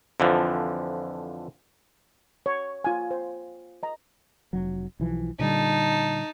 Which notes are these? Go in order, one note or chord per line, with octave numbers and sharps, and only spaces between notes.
F2 D3 E3 F3
C#5
F4 G#5
C5
D#5 A#5
F1 F#3
B1 E3 F3
A#2 D3 G3 D#4 A5